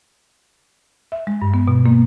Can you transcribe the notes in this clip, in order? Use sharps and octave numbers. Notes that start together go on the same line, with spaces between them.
E5
G#3
G2
B3
B2
A#3